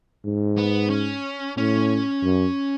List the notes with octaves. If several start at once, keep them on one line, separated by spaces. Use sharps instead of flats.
G#2
B3
C#4
A2 C#4
F#2